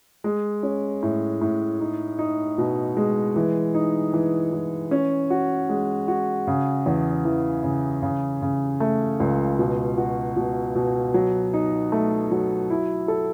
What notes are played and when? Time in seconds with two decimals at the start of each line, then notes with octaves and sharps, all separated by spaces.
0.24 G#3
0.63 C#4
1.03 A2
1.41 A2
1.80 D#4
2.19 D#4
2.58 B2
2.97 G#3
3.36 E3
3.74 D#4
4.14 E3
4.53 E3
4.91 C#4
5.30 F#4
5.69 G#3
6.08 F#4
6.47 C#3
6.86 E2
7.25 E3
7.63 C#3
8.02 C#3
8.42 C#3
8.80 A3
9.20 C#2
9.59 B2
9.98 F#4
10.36 B2
10.75 B2
11.14 F#3
11.54 D#4
11.92 A3
12.31 F#3
12.70 E4
13.08 A4